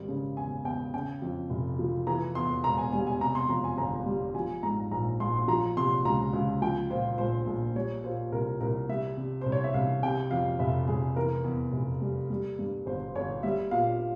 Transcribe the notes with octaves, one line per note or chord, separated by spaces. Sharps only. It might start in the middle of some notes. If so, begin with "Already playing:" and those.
Already playing: G#1 G3
C#3
E2 G#5
E2 G5
C#3 G5
F2
F1
F3
E3 A#5
E2 C6
E1 A#5
G#5
G3 G#5
G#5
C3 A#5
C6
F2 A#5
G#5
G1 A#5
G3
F3 G#5
G#2 A#5
A#1 A#5
A#1 C6
C6
F3 A#5
C3 C6
C#2 A#5
C#2
F3 G5
A#2 C5
A#1 C5
A#1
G3 C#5
A#2 C5
C2 A#4
C2 A#4
G3 E5
C3
C2 C5
C#5
E5
C2 F5
C3 G5
F2 F5
F1 E5
F1 G#4
E3 A#4
E2
F1
G3
G3
G2
G1 C5
G1 C#5
G3 E5
A#2 F5